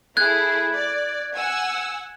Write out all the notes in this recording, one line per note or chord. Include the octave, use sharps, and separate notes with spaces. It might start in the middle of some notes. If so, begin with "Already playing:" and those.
A3 E4 G#4 F#6 G#6
D5
F#5 G#5 E6